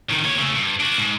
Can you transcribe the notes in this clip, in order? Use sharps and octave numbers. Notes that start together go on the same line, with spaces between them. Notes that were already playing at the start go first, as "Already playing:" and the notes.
A2 D#3
A#3 C#5
C#3 A3
G2
D4 F#4
G#2